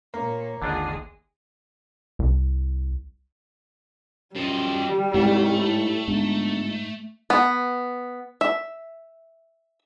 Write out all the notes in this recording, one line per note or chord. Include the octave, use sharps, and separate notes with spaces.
A#2 A#3 C#5
G#1 D#2 D3 G#3 D4 F4 G#4
C2
F#2 F3 G3 D#5
C2 G#2 A3
A2
G1 G#2
B3
E5